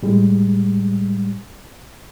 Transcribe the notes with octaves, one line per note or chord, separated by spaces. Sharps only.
A2 G3 G#3